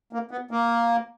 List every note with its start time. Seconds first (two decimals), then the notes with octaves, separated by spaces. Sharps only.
0.13 A#3
0.31 B3
0.51 A#3